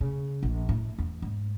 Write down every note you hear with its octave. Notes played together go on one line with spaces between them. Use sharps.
C#3
A#1
A2
E2
G#2